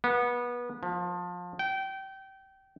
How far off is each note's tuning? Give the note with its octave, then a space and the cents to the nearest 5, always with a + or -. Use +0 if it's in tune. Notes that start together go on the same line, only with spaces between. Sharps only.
B3 -25
F3 +25
G5 -25